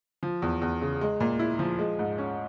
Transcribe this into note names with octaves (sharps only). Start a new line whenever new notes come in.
F3
E2
E2
C#3
G#3
A#2
E4
F3
G#3
G#2
C#4